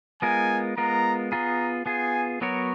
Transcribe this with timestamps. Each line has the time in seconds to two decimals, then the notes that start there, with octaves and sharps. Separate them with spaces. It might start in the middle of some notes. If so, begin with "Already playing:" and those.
0.22 G#3 B3 F4 A#4 G#5
0.77 G#3 B3 F4 A#4 A#5
1.32 B3 F4 G#4 A#5
1.86 B3 F4 G#4 G#5
2.41 F#3 B3 F#4 A#4 C#5